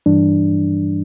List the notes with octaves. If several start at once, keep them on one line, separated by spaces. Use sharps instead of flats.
G2 E3 G3 D4